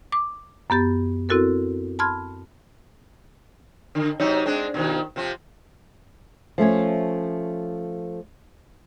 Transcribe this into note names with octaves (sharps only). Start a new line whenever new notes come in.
D6
F#2 B3 G4 A6
C4 E4 F#4 A4 A#4
A5 B5 C6 F6 G#6
D3
C3 F#3 D#4
G#3 C4 D4
B2 D#3 F3
C3 F3 C4
F3 A3 C#4 C#5